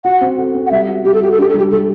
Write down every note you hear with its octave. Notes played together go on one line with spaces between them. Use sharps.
F#4 F#5
C4
A4
C4
F#5
G3 E5
F#4
G3 G4
A4
F#4 G4
A4
D4 G4
A4
G3 G4
G3 A4